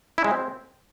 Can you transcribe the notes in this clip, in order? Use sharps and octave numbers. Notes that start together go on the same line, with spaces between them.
E4
G#3
C4